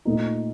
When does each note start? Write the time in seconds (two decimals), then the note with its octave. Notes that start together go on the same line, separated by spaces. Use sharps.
0.05 A#2 A3 D#4